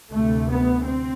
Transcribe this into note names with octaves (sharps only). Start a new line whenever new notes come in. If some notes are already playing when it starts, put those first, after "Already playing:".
D2 C3 A3
B3
C4